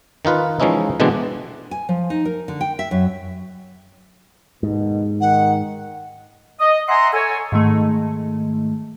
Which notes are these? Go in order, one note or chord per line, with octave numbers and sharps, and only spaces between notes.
D#3 D#4 F4 B4
E3 F3 G#3 C#4 D#4 E4
B2 D3 E3 G#3 C4 D4
G#5
F3
D#4
A#4
D3
G5
E5
F#2
D#2 G#2 B2
D#3 F#5
D#5
E5 F#5 G#5 A#5 C6
A4 C#5 G#5
G#2 D#3 A3